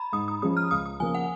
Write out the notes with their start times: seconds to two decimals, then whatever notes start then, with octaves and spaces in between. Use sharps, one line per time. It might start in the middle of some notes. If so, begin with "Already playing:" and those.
Already playing: A#5 B5
0.13 G#2 D#6
0.28 D#6
0.42 F3 G#3 C#4 D#6
0.57 F6
0.71 C#2 D#6
0.86 D#6
1.00 C#3 F3 A#3 G#5
1.15 F#5